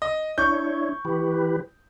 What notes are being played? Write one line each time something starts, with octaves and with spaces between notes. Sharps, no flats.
D#5
D4 E4 C#5 C#6 G6
E3 G4 B4